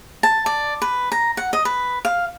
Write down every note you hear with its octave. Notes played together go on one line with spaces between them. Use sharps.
A5
D5
B4
A#5
F#5
D#5
B4
F5